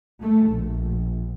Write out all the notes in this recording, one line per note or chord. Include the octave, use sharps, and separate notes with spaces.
A3
A#1